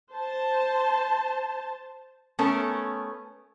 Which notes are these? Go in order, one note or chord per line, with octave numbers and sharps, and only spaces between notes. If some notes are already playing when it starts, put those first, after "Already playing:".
C5 A5
A3 B3 C#4 A4 A#4